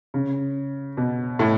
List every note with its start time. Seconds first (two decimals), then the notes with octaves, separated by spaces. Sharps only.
0.14 C#3
0.97 B2
1.39 A2